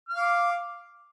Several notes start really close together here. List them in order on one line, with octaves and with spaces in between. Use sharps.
F6 F5 D6